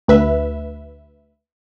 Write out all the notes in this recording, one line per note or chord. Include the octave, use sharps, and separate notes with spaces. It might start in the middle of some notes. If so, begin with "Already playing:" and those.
D2 B4 E5